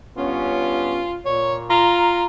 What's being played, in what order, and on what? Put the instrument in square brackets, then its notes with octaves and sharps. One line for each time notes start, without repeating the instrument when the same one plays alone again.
[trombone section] G2 B3 C#4 [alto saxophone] F4
[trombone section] A#2 [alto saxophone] C#5
[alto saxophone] F4 [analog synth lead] A#5